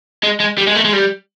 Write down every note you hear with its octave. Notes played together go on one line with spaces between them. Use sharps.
G#3
G#3
G3
G#3
A3
G#3
G3